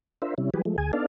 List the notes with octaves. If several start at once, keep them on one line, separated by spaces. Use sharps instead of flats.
D4 F4 A#4 C5 E5
C3 G3 C#4 E4
E3 F#3 G3 G4 G#4 B4
F3 G#3 A3
D2 G#4 G#5
B3 D4 D#4 A4 D5 F5